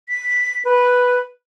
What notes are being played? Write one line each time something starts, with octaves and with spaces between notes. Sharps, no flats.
B6
B4